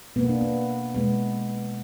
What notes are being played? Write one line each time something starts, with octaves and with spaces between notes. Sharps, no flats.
B2 A#3 B3
D4
B3
B2 G#3 B3